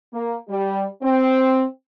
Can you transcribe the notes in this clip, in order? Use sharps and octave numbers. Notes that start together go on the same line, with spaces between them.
A#3
G3
C4